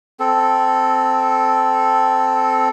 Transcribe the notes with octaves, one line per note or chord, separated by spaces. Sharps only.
C4 A4